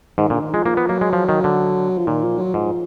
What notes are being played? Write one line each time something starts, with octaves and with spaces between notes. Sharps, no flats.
G#2 D#3
A#2 D3
D#3
F3 G#3
F3 A#3
B3
F#3 A#3
G#3
F3
D#3
D3
F3
A#2 D#3
F3
F#3
G#2 F3